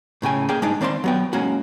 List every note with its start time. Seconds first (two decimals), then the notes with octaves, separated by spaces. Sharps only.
0.22 A2 C#3 G5 G#5
0.49 A#3 G#4 G5
0.62 G#3 D4 D#4
0.81 D#3 C4 D5 E5 C6
1.04 F#3 B3 G5
1.33 G#3 A#3 C#4 F#4